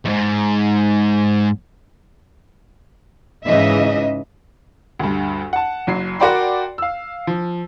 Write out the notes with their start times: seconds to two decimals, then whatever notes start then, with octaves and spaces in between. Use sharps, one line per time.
0.05 E2 G#2
3.45 G#2 C#3 E3 D#5 E5
4.99 D2 G2
5.53 F#5 A5
5.87 F#1 F#3 C7
6.19 F#4 A#4 D5 G5 B5 C6
6.78 F5 E6
7.27 F3